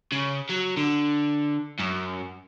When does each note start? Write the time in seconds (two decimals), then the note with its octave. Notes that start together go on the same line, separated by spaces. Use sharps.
0.12 C#3
0.49 F#3
0.77 D3
1.80 F#2